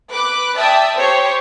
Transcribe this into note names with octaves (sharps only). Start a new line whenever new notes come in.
B4 D6 F#6
D5 E5 G5 A5 D#6
G4 C5 C#5